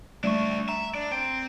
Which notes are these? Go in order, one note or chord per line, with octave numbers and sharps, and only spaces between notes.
G3 A3 D4 E5 C#6
E5 A#5
D4 D5
C4 G5